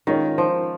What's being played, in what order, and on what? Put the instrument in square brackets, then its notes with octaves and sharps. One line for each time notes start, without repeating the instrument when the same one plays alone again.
[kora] D#3 [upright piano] G#3 C#4 F4 A#4 C#5
[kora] F3